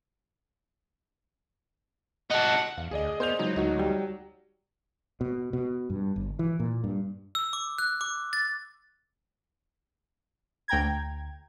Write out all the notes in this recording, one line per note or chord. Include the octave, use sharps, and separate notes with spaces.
D#4 A4 F#5
E2 F5
D2 G#4 D5 D#5
B3 C5 G6 F7
C#2 F#3 D#4
D2 D#4 F#4
G3
B2
B2
G2
G1
E3
A#2
G2
E6
D6
F#6
D6
A6
D2 G5 A#5 G#6